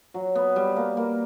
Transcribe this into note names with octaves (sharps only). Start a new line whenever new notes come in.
F#3
B3
G3
A#3
A#3